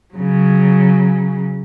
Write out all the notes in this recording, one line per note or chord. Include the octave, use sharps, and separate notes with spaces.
C#3 F#3